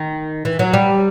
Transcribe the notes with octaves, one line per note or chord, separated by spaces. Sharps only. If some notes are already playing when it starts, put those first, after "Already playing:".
Already playing: D#3
E3
F#3
G3